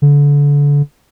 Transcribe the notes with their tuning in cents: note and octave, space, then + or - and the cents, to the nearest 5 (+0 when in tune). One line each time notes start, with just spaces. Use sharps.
D3 -30